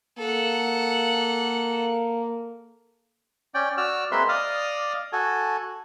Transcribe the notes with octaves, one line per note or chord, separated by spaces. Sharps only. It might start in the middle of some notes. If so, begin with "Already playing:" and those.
A#3 A4 F#5
C#4 D5 G5
F#4 D5 E6 F6
G#3 A#3 C4 B4 E5 C6
D5 D#5 F5 D#6 F6
F#4 A4 G#5